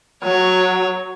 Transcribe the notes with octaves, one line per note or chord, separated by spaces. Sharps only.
F#3 C#5